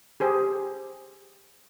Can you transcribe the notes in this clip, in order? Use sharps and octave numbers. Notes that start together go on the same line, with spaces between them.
G4 G#4 C5